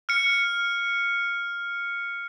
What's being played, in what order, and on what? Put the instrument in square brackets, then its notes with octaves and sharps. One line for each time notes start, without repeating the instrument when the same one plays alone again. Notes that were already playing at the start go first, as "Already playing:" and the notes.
[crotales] F6 C#7